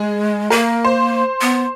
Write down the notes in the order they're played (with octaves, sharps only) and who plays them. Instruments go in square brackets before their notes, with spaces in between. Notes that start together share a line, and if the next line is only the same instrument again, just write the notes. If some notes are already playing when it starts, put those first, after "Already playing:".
Already playing: [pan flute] G#3 [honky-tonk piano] G#4
[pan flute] A#3 [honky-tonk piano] A#4
[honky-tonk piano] C5
[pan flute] B3